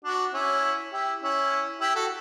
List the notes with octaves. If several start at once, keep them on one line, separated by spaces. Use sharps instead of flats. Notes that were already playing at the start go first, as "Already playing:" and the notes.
D4 F#4
C#4 E4
E4 G4
C#4 E4
E4 G4
F#4 A4